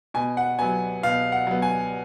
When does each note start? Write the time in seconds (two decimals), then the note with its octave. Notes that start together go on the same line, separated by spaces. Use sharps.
0.14 B2 G#5
0.37 F#5
0.59 F#3 B3 G#5
1.03 B2 F5
1.32 F#5
1.47 F#3 B3
1.62 G#5